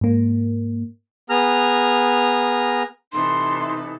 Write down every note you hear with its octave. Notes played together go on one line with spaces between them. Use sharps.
G#2 A#3
B3 G#4 A#5 F6
C3 E3 D#4 A4 C6